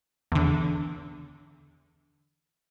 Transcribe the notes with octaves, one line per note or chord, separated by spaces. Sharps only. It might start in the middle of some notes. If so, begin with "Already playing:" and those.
E2 D3